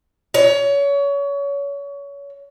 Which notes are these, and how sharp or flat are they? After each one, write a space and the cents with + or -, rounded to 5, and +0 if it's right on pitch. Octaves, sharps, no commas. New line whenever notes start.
C#5 +30